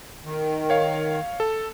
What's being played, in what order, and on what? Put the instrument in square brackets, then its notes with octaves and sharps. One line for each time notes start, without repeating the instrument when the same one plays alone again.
[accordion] D#3
[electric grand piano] C#5 F5
A4